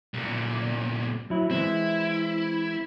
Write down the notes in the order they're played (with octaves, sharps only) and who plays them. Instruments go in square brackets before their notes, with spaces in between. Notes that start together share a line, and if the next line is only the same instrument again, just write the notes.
[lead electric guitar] C2 A#2
[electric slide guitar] F#3 E4
[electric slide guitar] E3 G#3 C4 [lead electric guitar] E4